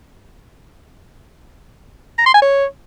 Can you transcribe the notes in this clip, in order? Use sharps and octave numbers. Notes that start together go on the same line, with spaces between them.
A#5
C6
G#5
C#5